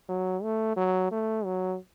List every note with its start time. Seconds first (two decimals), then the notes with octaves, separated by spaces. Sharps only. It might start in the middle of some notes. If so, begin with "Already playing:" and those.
0.09 F#3
0.43 A3
0.77 F#3
1.11 A3
1.45 F#3